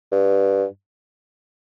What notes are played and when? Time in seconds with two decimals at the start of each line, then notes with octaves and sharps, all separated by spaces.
0.12 G2